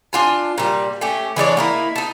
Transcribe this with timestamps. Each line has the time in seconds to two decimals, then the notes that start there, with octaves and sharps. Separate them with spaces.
0.13 D4 F4 G#5
0.58 A#2 G3
1.01 A3 C#4 G4
1.36 E3 G#3 D4 C#5
1.57 A#3 D#4 E4
1.96 D#4 A5